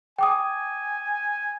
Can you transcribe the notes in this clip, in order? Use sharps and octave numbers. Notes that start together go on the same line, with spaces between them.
G5 G#5 D6 D#6